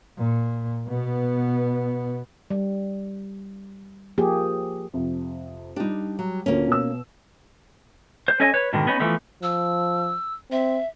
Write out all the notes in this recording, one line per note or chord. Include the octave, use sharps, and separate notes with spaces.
A#2
B2 B3
G3
F3 A#3 G4 G#4
F2 C3
G3 D4 D#4 G4
F#3
D2 A#2 A#3 C#4
B2 E6
C5
C#4 A4 C#5 D#5 G#5
B4 C#5
G#2 B2 D3 D#3
B3 C#4 D#4
E3 F3 A3 B3
F3 E6
C4 E5